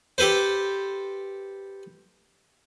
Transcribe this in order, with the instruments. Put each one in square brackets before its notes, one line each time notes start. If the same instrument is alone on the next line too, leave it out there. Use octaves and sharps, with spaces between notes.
[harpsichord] G4 A4 B4 C5